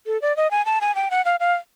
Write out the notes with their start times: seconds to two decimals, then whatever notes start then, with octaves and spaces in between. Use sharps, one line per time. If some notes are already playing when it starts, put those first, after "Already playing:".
0.07 A4
0.22 D5
0.37 D#5
0.51 G#5
0.66 A5
0.81 G#5
0.95 G5
1.11 F#5
1.25 F5
1.40 F5